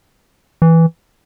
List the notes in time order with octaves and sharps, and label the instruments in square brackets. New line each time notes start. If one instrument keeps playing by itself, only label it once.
[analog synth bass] E3